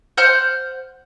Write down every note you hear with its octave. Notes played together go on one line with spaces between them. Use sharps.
C5 F#5 F6 G6